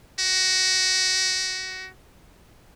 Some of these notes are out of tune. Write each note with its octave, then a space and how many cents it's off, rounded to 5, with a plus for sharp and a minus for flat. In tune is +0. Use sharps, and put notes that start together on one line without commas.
F#4 +20